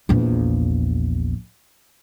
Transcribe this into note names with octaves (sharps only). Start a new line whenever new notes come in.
A#1 E2